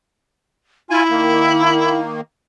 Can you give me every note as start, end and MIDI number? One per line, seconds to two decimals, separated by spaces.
0.90 1.98 64
0.90 1.03 65
0.90 1.03 80
1.10 2.21 51
1.10 2.21 58